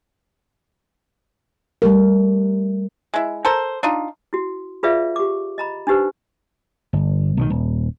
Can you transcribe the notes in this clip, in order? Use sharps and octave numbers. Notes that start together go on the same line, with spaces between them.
G3 A3 A#4
G#3 E4
A4 A#4 C5
D4 D#4 F4
E4 F#4
F4 G#4 B4 D5 E5 F5
G4 D6
D#5 A#5 B5
D4 D#4 G4 B4 C5
G1
B1 D3 D#3
D#1